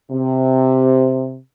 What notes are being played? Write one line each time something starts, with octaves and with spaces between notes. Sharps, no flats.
C3